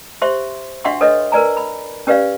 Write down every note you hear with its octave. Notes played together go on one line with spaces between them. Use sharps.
G4 C5 E5 C6 C#6
D4 F#4 E5 F#5 C6 C#6
D4 A4 B4 C#5 D#5
A#4 B4 D5 G#5 A#5
B5
C#4 G4 B4 D5 F5